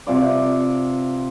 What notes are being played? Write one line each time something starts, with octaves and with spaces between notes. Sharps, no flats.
C3 F4 D5